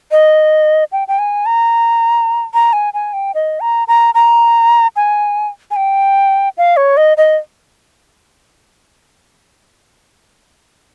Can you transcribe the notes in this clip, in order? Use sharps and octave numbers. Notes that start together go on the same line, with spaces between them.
D#5
G5
G5
G#5
A#5
A#5
G#5
G#5
G5
D#5
A#5
A#5
A#5
G#5
G#5
G5
F5
C#5
D#5
D#5